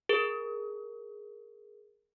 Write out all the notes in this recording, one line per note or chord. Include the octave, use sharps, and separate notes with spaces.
G#4 A#4